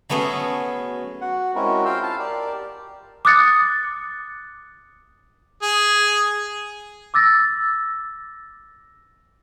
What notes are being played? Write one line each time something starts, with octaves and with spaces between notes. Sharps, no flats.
F#3 A3 B3 C#4 G#4
F#4 F#5
G#3 C4 C#4 E4 F#4 A#4
F4 F5 G5 E6
F5 A5
G4 A#4 D5
D6 D#6 F#6 A6 C#7
G#4
D6 E6 A6 A#6